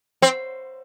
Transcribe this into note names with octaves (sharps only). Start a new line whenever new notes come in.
C4